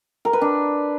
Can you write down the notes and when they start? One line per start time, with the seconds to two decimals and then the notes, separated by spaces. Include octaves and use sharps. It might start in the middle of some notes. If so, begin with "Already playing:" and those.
0.25 A#4
0.33 B4
0.41 D4